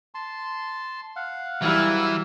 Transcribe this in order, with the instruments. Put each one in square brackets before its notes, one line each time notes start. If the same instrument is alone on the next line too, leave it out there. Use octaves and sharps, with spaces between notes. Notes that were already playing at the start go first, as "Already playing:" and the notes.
[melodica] A5 C6
F5 F#5
[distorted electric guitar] E3 [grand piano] F#3 G3 F6 [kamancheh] E4 E6